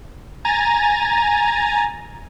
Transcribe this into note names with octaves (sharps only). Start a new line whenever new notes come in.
G#5 A#5 A6